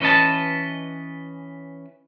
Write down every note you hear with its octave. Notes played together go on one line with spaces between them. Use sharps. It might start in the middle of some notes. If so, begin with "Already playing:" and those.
E3 C#4 B4 D#5 A5